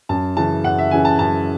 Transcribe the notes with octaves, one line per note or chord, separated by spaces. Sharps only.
F#2 A5
C#3 E3 A5
F#2 F#5
E5
C#3 E3 G#5
A5
F#2 A5